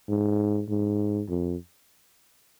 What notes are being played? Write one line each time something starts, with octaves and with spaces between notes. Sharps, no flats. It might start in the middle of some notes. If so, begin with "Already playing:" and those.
G#2
G#2
F2